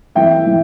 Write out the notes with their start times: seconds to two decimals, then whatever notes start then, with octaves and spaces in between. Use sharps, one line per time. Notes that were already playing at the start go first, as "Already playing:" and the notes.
0.15 E3 E5 G5
0.46 E3